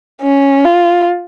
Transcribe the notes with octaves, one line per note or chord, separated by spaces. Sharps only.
C#4
F4